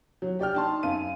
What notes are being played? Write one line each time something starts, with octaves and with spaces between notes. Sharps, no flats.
F#3
G4 D5 G5 F6
D#4 A5 C6
F#2 F5 D#7